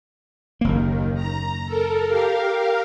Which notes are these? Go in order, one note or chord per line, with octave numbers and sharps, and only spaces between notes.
F#1 D#2 D#3 A#3
A#5
A4 A#4
G4 A#4 F5